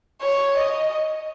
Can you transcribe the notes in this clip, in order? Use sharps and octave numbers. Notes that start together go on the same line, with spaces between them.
C#5
D#5